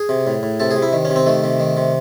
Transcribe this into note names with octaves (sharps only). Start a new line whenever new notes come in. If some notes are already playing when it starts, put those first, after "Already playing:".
Already playing: G#4
C3
A2
A2
C3 A4
G#4
C3
E4
D#3
C#4
C3
C4
D#3 A3
C3
D#3
C3